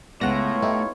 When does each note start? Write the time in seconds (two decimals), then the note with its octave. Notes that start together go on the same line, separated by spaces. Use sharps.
0.21 C#2 A2 G#3 B3 F4 C#5 F#5 A#6
0.62 A3 D#4 E4 G4